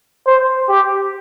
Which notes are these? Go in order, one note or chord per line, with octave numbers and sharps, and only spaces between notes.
C5
G4